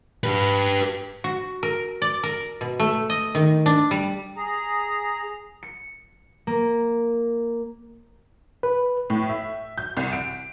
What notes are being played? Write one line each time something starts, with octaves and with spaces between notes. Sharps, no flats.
G4 B4
F#4
A#4
D5
A#4
B2
A3
D#5
D#3
D4
G3
G#4 A#5
C#7
A#3
B4
A2
E5
G6
C2
D7